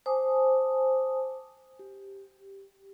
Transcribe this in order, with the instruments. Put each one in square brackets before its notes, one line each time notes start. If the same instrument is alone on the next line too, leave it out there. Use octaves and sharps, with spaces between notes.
[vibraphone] C5 G#5 A5 D6 D#6
G4